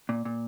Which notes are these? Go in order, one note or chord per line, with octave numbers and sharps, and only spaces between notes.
A#2
A#2